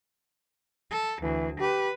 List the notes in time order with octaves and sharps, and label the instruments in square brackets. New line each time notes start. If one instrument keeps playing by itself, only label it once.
[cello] A4
[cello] D2 [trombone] E3
[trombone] G4 [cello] B4